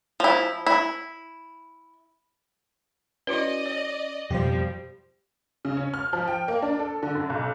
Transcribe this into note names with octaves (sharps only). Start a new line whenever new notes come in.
F3 E4
E4
C#4 E4 F#4 B4 D5 D#5
C#5
F2 B2 F3 G3 G4 C5
C#3
C#4
F6
F3
G5
A#3
D4
A4
D3
F#2
B1